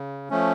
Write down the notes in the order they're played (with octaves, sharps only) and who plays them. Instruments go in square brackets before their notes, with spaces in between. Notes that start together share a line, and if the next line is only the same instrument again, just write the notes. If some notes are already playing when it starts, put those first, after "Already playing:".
Already playing: [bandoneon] C#3
F3 A3 C#4